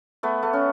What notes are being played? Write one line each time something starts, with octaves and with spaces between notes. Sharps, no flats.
A3 B3
A3
C#4